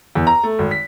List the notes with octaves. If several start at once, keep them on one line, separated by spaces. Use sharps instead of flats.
E2
A#5
A3
G#1
B6